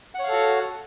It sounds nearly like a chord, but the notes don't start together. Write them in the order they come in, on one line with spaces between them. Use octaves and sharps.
F#5 C#5 F5 A4 F#4